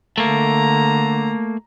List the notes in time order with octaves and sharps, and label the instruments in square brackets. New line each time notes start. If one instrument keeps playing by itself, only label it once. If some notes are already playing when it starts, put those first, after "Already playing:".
[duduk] D3 [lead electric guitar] A3 A#3 [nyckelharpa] A#5